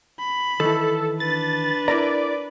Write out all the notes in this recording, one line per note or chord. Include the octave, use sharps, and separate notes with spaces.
B5
D#3 E3 A4
D4 B4 A6
E4 A#4 D5 A#5